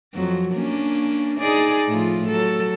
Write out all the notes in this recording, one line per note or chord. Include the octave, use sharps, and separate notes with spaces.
F2 F#3
A#3 C#4 D4
D#4 G#4 D5
A2 F3 F4
F#3 A4